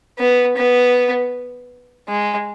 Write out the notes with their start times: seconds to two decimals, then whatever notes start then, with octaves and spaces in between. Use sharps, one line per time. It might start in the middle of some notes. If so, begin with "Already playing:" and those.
0.18 B3
0.57 B3
2.08 G#3